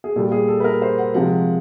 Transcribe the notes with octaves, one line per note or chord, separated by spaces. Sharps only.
G#4
A#2 G3 A4
G#4
A4
B4
A#4
C5
F#5
C3 F3 G#3 F#5